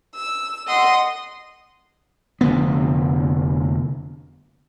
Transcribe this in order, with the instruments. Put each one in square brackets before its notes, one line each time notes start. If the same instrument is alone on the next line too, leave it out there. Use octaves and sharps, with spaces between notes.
[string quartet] E6
D#5 F#5 C6
[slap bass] F1 D3 B3